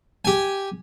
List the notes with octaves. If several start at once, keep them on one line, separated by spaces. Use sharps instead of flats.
G4 G#5